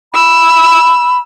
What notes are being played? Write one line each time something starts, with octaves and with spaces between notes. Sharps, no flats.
B5 E6